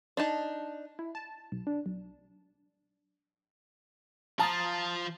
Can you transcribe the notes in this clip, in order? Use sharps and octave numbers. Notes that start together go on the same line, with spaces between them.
D4 D#4 A5
E4
A5
B1
D4
B1
F3 F4 A5 A#5 D#6 A6